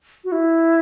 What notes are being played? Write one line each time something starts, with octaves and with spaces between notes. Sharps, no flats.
F#4
E4